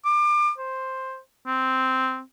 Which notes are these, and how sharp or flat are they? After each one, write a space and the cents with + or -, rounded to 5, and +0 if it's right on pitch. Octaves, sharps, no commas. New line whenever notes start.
D6 +30
C5 +5
C4 -5